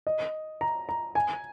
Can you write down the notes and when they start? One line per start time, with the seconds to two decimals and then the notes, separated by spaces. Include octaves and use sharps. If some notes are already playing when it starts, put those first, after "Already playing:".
0.07 D#5
0.61 A#5
0.89 A#5
1.15 G#5